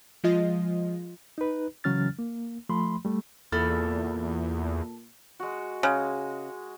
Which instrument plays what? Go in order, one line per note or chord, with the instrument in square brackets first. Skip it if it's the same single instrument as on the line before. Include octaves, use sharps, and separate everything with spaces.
[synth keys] F3 G#3 F4 D#5
[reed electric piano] D#4 B4
C#3 E3 F#3 C#4 F6 A6
A#3
F3 A3 B5 C6
G3 A3
[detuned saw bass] E2 [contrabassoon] A#2 [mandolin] A4 B5 F6
[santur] G#3 F#4
[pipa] C#3 [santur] G#3